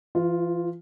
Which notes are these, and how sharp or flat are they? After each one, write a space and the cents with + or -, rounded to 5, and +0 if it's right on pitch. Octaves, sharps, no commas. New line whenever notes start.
E3 +40 F4 +0